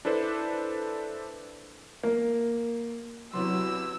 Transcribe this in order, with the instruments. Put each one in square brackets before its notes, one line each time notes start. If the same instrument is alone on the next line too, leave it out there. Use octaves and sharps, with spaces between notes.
[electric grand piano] D4 E4 A4 B4 C5 D5
[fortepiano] A#3
[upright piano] C3 B3 C6 [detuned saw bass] F#3 [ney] E4 [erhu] E6